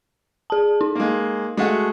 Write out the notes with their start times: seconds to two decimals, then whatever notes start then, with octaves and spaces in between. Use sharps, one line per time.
0.50 G#4 A5
0.81 D#4
0.95 G#3 A#3
1.57 G#3 A3 F#4